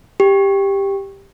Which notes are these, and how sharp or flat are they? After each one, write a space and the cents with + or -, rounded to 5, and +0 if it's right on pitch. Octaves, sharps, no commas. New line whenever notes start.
G4 +10